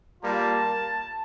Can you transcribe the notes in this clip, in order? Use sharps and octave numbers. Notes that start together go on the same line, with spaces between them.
G3 A#3 F4 A5